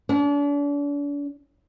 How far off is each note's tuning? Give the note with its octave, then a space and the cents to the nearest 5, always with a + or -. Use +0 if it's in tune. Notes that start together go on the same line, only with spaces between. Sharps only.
D4 -40